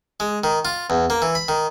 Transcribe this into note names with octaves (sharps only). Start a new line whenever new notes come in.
G#3
D#3
F4
E2
A#3
E3
B5
D#3